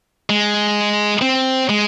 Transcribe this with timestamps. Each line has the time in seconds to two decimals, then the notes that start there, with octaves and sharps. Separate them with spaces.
0.30 G#3
1.22 C4
1.69 G#3